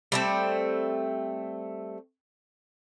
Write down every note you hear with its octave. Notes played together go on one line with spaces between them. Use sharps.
G3 A3 C4